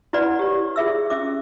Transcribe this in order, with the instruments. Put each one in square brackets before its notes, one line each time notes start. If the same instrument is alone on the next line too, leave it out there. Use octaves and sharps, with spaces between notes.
[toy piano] E4 F#4 B4 D5 F#5 B5
G4 C#5
F4 G#4 E5 E6
C#4 E5 D6